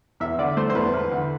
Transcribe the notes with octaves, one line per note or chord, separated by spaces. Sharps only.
E2 E5
D3 D5
A3 C5
C5
E2 B4
E2
D3